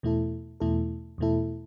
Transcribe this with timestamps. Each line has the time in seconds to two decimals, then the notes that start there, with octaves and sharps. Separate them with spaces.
0.03 E2 B2 A3 E4 A4
0.60 E2 B2 A3 E4 A4
1.18 E2 B2 A3 E4 A4